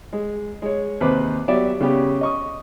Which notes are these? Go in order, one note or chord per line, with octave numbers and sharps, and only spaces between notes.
G#3
G#3 C#5
D#2 C3 B4 C5 D6
F#3 B3 G4 D5 E5
C#3 B3 C#4 G4
D#5 C#6 D#6